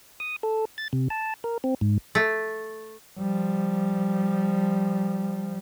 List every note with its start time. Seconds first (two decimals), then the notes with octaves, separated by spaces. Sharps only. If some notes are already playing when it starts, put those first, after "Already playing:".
0.20 D#6
0.43 A4
0.78 A6
0.93 C3
1.10 A5
1.44 A#4
1.64 C4
1.81 G#2
2.15 A3
3.19 F3 G3